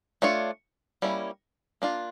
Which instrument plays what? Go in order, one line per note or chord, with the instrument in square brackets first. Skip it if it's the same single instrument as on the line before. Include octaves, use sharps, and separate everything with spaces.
[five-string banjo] A3 D4 F4 C#5
G3 A#3 C#4 E4
A#3 D4 F4